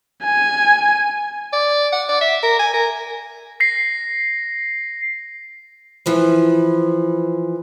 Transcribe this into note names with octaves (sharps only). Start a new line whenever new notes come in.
G#5
D5
F#5
D5
E5
A#4
G#5
A#4
A#6 C7
E3 F3 B4